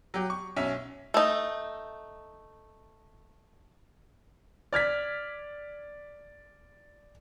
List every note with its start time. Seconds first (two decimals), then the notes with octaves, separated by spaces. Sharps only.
0.14 F#3 G4
0.30 C#6
0.56 B1 C#4 E5
1.14 A3 D#4
4.73 D5 F6 G#6 B6